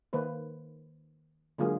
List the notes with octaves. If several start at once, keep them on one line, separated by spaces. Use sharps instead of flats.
D#3 A#3 B4 C5
D3 F#3 G#3 A#3 F4 G#4